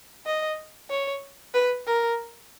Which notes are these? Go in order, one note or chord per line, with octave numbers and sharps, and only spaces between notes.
D#5
C#5
B4
A#4